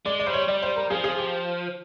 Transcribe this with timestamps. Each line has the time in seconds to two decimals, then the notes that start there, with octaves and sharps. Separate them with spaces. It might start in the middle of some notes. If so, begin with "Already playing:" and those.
0.06 G#3 D5
0.19 D5
0.26 G3 C5
0.34 C#5
0.48 G3 D5
0.62 C5
0.76 A#4
0.90 F3 G#4
1.04 G#4
1.18 G4